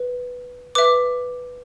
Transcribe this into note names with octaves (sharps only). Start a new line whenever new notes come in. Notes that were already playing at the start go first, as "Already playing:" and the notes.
Already playing: B4
B4 E5 D6